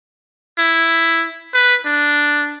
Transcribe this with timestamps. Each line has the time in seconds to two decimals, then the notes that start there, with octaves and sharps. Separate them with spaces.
0.58 E4
1.54 B4
1.86 D4